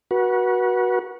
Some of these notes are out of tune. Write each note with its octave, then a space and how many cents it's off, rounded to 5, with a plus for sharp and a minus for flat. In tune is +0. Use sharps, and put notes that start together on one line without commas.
F#4 +0 B4 -35